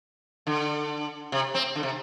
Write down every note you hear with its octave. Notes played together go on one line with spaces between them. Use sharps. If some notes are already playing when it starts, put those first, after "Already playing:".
D3
C3
C4
D3
C3